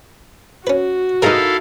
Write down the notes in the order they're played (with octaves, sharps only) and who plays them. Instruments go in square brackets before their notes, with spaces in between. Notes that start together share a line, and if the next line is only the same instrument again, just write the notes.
[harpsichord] C#4 B4 [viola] F#4
[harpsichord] G2 G#3 G#5 [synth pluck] D#4 A#4 [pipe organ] E4 A4 F5